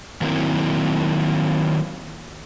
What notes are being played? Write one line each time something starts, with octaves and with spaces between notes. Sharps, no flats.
D#3 F#3 A#3 C4 E4